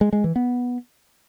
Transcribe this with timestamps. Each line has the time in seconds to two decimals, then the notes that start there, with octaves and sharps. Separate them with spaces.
0.01 G#3
0.13 G#3
0.24 E3
0.36 B3